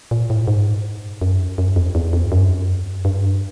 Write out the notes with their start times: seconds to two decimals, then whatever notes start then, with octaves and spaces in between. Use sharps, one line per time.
0.11 A#2
0.30 A2
0.47 G#2
1.21 F#2
1.58 F#2
1.76 F2
1.95 E2
2.13 F2
2.26 G2
2.32 F#2
3.05 G2